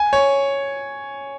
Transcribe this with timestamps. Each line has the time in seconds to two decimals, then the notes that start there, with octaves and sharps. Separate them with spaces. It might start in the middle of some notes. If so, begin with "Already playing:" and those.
Already playing: G#5
0.13 C#5